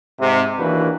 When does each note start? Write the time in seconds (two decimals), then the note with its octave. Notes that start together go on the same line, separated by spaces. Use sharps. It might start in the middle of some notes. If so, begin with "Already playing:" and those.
0.20 G#2 C3
0.58 D#2 E3 A#3 D4 F#4 B4